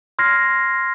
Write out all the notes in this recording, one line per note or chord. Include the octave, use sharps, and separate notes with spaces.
C6 F6 G#6 A#6 C7